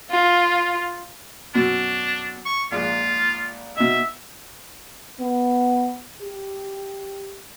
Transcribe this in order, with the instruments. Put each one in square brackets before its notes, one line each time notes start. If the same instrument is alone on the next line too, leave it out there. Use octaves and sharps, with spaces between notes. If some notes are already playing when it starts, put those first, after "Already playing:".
[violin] F4
[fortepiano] F#2 B2 [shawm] D4
[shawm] C#6
[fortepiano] A#1 G#2 [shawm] F4
[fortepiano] B2 D#4 [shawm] E5
[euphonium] B3
G4